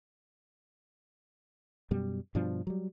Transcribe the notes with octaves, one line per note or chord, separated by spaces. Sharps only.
F#2 B2 G3
G2 B2 F3 D4
F#3 G3